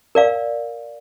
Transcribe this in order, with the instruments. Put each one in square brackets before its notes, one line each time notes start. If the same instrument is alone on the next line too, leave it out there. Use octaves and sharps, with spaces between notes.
[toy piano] A#4 D5 F5